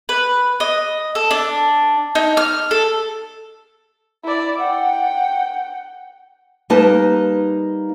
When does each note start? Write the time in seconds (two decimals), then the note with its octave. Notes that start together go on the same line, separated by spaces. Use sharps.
0.09 B4
0.60 D#5
1.15 A4
1.31 D4
2.15 D#4
2.37 F6
2.71 A4
4.24 E4 D5
4.60 F#5 G5
6.70 G3 A#3 D#4 B4 A5